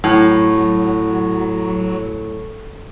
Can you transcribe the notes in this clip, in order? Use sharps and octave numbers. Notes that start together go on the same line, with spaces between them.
A2 F#3